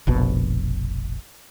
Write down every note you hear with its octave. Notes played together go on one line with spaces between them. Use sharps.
F1 A#1 B2